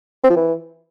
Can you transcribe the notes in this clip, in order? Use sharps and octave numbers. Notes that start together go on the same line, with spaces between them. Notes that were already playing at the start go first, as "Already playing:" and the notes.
C4
F3
E3